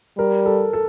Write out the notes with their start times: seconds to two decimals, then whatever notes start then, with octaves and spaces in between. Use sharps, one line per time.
0.18 G3 A#4
0.46 A4
0.73 A4